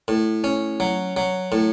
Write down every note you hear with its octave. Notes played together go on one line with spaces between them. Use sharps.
A2
C#4
F#3
F#3
A2